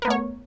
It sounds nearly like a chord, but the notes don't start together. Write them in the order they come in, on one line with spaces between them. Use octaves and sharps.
A#4 B3 A3 C#5